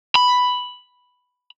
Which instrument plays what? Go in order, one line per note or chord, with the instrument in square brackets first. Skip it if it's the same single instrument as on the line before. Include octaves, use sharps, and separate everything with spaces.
[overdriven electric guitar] B5